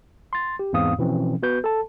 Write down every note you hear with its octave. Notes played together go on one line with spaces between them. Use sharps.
C6 A6
G4
E2 G#2 C4 F5 D#6
B2 E3 F3 C4 C#4
B3 F#4 B4 G6
A4 A5